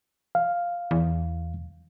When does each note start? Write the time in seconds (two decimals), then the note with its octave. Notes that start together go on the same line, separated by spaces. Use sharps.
0.35 F5
0.91 E2